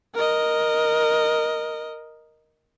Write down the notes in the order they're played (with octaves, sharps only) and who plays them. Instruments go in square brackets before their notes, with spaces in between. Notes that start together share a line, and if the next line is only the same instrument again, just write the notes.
[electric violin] A#4 D#5